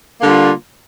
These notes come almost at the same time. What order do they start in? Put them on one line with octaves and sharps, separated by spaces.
A#3 D3 G3 F4